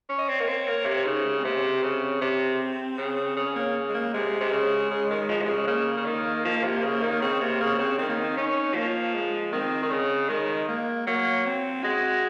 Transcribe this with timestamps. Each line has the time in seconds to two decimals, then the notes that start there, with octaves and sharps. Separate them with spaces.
0.09 C#4
0.18 D#5
0.28 C4 C#5
0.40 A#3
0.48 C4
0.67 A#3
0.86 C3
1.05 C#3 D#4
1.25 G#3
1.39 C4
1.44 C3 A#3
1.54 C#4
1.63 C4
1.82 C#3
2.22 C3
2.98 C#3
3.37 C#3 C#4
3.56 A#3
3.89 G#3
3.94 A#3
4.14 C3 G#3
4.41 C3
4.51 C#3
4.90 C#3
5.10 D#3
5.29 F3
5.42 C3
5.49 C#3
5.67 C#3 A#3
5.97 C#3
6.06 D#3
6.45 F3
6.63 C3
6.83 C#3
7.03 D#3
7.21 C#3 C4
7.40 C3 A#3
7.60 C#3 A#3
7.79 C#3 C4
7.98 D#3 C4
8.09 A#3
8.20 C4
8.37 C#4 D#4
8.75 F3 A#3
9.14 G#3
9.52 D#3 C4
9.83 D#3
9.91 C#3
10.29 D#3 G#3
10.68 A#3
11.06 F#3 A#3
11.45 C4
11.84 G#3 F#4